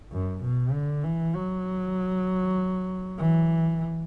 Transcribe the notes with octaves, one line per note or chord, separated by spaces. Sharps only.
F#2
B2
D3
E3
F#3
E3